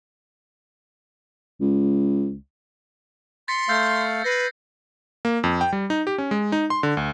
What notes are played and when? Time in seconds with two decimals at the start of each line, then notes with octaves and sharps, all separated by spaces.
1.61 C#2
3.48 C6 A6 B6 C#7
3.69 A3 F5 E6 G6 A6
4.24 B4 A#6 C7
5.25 A#3
5.44 F2
5.61 G5
5.73 G3
5.90 D#4
6.07 G4
6.18 C#4
6.31 G#3
6.52 D#4
6.70 C6
6.83 D3
6.97 D2